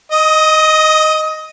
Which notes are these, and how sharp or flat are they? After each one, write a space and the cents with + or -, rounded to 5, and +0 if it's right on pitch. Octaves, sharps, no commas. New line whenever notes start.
D#5 +0 D#6 +25